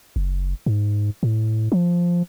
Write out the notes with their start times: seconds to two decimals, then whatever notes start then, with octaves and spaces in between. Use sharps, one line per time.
0.16 F#1
0.66 G#2
1.23 A2
1.72 F3